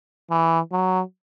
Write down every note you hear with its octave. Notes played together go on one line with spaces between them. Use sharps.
E3
F#3